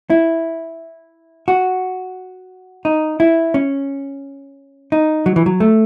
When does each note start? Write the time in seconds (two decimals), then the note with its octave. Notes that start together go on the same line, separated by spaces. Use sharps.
0.10 E4
1.48 F#4
2.85 D#4
3.20 E4
3.54 C#4
4.92 D#4
5.26 F#3
5.36 E3
5.46 F#3
5.60 A3